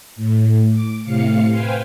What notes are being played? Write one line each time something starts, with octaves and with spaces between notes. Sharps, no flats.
A2
D6
A2 C3 F5 C#7
B4 C5 F5 G5 G#5